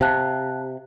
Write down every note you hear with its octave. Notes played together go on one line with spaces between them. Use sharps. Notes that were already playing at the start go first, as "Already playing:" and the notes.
C3 F5 A5 F#6